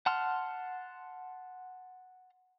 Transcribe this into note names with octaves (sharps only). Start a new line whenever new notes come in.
F#5 A5 C6 F6